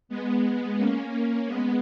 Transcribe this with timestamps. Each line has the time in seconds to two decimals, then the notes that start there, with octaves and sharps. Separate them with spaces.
0.09 G#3 B3
0.77 A#3 C#4
1.12 A#3 C#4
1.46 G#3 B3